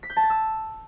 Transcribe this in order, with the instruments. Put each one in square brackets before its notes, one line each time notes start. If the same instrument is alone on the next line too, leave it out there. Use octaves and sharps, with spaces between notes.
[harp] B6
G6
A5
A6
E6